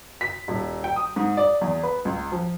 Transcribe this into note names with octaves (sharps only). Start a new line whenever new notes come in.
B6
D#1
G5
D#6
G#2
D5
E2
B4
C#2
F3